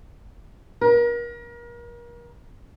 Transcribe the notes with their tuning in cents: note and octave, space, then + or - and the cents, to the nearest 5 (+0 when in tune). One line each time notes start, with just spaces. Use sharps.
A#4 +35